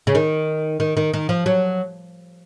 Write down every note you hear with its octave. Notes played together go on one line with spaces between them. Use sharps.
C#3
D#3
D#3
D#3
D#3
F3
F#3